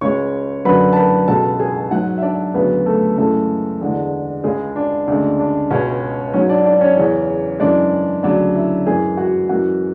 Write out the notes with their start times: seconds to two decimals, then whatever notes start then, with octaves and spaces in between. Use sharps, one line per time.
0.01 C#2 C#3 G#3 C#5 C#6
0.65 F#2 D3 F#3 B4 B5
0.93 A5
0.96 B4 B5
1.28 C#2 B2 G#3 A4 A5
1.60 G#4 G#5
1.91 G#2 F#3 F#4 F#5
2.18 E5
2.22 D4 D5
2.54 D2 C#3 F#3 B3 B4
2.86 A3 A4
3.17 F#2 C#3 E3 G#3 A3 A4
3.81 E2 D3 G#3
4.44 C#2 C#3 G#3 G#4
4.76 D4
5.08 D2 C#3 G#3 D4
5.39 D4
5.70 C#2 B2 G#3 C#4 C#5
6.33 G#2 F#3 C#4 C#5
6.49 D4 D5
6.65 D4 D5
6.81 C#4 C#5
6.96 E2 C#3 E3
7.60 F#2 C#3 E3 G#3 D4 D5
8.23 D2 C#3 F#3 D4 D5
8.55 E4 E5
8.86 F#2 E3 G#3 G#4 G#5
9.17 F#4 F#5
9.49 F#2 E3 G#3 F#4 F#5